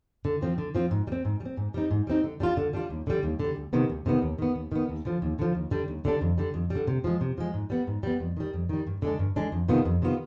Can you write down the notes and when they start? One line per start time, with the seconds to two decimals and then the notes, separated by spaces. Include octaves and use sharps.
0.25 D3
0.41 F3 C4 F4
0.58 D3
0.75 F3 C4 F4
0.91 G#2
1.07 G3
1.12 C4
1.25 G#2
1.40 G3
1.45 C4
1.57 G#2
1.74 G3 C4 D#4
1.91 G#2
2.07 G3 C4 D#4
2.24 D3
2.40 G3 D4 F4
2.57 D3
2.73 G3 D4 F4
2.90 D#2
3.07 D3 G3
3.23 D#2
3.40 D3 G3
3.56 D2
3.73 C3 D#3 B3
3.90 D2
4.06 C3 D#3 B3
4.22 D#2
4.39 D#3 B3
4.55 D#2
4.72 D#3 B3
4.89 D#2
5.05 D3 F3
5.22 D#2
5.39 D3 F3
5.55 D#2
5.71 D3 G3 D4
5.88 D#2
6.05 D3 G3 D4
6.21 F2
6.38 D3 G3
6.54 F2
6.70 G3
6.75 D3
6.87 C3
7.04 F3 G#3
7.21 C3
7.38 F3 G#3
7.54 G#2
7.70 G3 B3
7.87 G#2
8.03 G3 B3
8.20 F2
8.37 D#3 G3
8.53 F2
8.69 D#3 G3
8.87 G2
9.02 D3 G#3 D4
9.19 G2
9.36 D3 G#3 D4
9.52 F2
9.68 C3 D#3 B3 F4
9.85 F2
10.02 C3 D#3 B3 F4